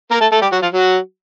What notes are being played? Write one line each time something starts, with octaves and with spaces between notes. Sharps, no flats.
A#3 A#4
A3 A4
A3 A4
G3 G4
F#3 F#4
F3 F4
F#3 F#4